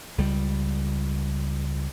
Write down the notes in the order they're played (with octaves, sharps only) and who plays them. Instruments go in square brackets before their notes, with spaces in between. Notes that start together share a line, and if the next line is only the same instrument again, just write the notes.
[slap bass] C#2 G3